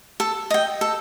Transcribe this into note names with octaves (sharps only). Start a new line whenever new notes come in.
A4
D#5 G5
A4